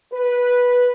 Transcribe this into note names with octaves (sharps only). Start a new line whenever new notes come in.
B4